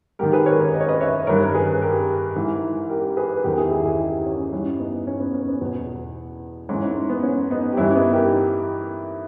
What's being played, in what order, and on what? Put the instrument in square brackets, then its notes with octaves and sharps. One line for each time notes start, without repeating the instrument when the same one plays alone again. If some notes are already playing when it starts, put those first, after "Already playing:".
[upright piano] G#2 D#3 G4 A#4
G#4 B4
A#4 C#5
A#4 C#5
D#5
C#5
B4 D#5
C#5 E5
G2 D#3 A#4 C#5
A#4
G#4 B4
G4 A#4
G#2 E3
G4 A#4
G#4 B4
B4
E2 D#3 G4 A#4
E4 G#4
E4 G#4
E4 G#4
D#4 G4
C#4
G2 E3 C#4
B3 D#4
C#4
B3
C#4
B3
E2 B2 B3
G#2 E3 C#4
C#4
B3
C#4
B3 D#4
G4
G2 E3 C#4 E4
B3 D#4
G4 A#4